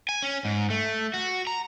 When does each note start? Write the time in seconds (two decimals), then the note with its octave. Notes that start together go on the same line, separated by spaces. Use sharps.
0.09 G#5
0.23 C#4
0.45 G#2
0.70 A3
1.14 F#4
1.47 A#5